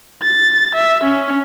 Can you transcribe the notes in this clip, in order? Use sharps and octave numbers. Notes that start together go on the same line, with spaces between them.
A6
E5
C#4